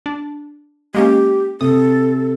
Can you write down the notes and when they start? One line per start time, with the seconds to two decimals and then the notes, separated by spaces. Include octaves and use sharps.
0.06 D4
0.95 G#3 A#3 C#4 G4
1.61 C3 A4 D#6